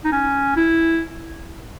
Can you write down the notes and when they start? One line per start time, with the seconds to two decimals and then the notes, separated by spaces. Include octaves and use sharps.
0.04 D#4
0.12 C#4
0.56 E4